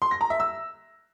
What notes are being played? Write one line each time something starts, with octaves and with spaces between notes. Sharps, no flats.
C6
A#6
A#5
E5
E6